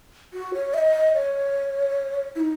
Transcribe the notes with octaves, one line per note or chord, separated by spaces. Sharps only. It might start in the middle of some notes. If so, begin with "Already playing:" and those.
F#4
C#5
E5
D#5
C#5
E4
D#4